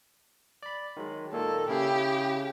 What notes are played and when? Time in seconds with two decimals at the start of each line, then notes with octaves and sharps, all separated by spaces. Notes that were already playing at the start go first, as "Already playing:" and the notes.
0.63 D5 B5
0.97 D#3 F#3 G#3
1.32 A#2 D#3 A#3 A4
1.69 C#3 E4 G4 G#4